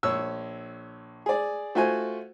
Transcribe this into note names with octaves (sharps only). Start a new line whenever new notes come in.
A#1 C#5 E6
G#4 D5
A3 F4 F#4 C5 G#5